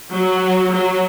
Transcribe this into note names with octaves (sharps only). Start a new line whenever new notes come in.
F#3
F#3